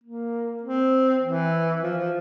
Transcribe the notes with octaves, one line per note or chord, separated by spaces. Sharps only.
A#3
C4
E3
F3
F3